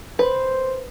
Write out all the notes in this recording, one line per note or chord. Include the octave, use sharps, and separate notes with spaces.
B4 C5